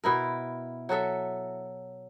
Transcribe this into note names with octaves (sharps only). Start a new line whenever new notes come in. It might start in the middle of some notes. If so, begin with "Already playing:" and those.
B2 E4 A#4
F#3 F#4 A4 E5